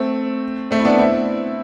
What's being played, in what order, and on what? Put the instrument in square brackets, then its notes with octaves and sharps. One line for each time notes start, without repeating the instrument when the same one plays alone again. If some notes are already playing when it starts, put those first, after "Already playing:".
Already playing: [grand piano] A3 C4
A3 C4
E4
B3 D4
C4 E4